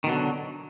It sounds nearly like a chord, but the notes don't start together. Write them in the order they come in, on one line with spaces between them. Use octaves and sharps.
D#3 B2 F#3 D3